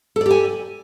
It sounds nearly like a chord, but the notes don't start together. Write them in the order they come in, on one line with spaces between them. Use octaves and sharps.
A4 D5 G4 G#5